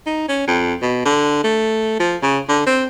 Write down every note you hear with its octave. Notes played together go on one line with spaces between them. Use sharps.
D#4
C#4
F2
B2
D3
A3
F3
C#3
D3
C4